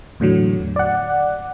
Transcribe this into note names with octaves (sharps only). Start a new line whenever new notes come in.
E2 A2 D3 F#3
D5 F#5